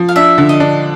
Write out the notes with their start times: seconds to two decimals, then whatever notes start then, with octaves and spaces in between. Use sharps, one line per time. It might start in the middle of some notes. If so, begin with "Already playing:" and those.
Already playing: F3
0.09 F5
0.16 D4 E5
0.38 D3
0.49 D#5
0.60 D4